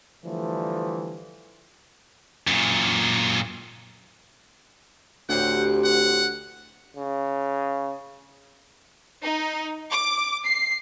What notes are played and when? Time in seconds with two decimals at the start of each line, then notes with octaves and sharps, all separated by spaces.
0.23 D3 E3 F3 G3 A3
2.47 F#2 A#2
5.29 D2 A2 C4 G4 F#5
5.84 F#5
6.96 C#3
9.21 D#4
9.90 D6
10.46 C7